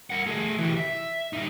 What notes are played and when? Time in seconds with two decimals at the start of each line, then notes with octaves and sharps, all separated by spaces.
0.10 A#4 F#5
0.26 A3 G#4
0.58 E3 G4
0.77 E5
1.33 G3 D#4